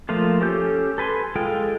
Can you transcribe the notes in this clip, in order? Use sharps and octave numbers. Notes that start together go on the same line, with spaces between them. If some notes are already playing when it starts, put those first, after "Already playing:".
F3 A3 A#3 F4
C#4 G4 A4 G6
A4 B4 G#5 C6
G#3 F4 A4 G5